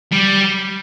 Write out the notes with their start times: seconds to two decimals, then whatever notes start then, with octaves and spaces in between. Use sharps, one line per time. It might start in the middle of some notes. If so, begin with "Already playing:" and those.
0.12 G3